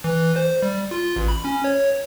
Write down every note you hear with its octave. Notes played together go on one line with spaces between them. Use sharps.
E3
C5
G3
F4
A1
B5
C#4
C#5